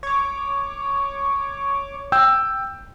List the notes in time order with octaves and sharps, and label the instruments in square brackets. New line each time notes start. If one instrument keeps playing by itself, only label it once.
[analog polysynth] C#5 D6
[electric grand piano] G5 E6 G6